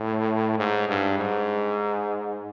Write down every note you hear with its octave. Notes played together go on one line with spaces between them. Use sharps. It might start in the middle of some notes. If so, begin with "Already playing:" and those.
Already playing: A2
G#2
G2
G#2